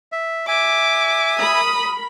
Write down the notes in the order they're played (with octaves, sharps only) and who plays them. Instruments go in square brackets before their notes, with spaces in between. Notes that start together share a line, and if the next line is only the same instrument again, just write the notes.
[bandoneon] E5
[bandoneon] E5 G#5 [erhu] D6
[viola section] A#4 B5 [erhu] D#6